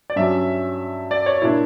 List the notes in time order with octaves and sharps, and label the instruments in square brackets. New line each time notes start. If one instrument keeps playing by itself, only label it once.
[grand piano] D5
G2 F#3 C#4 E5
D5
C#5
A#2 A#3 D4 E4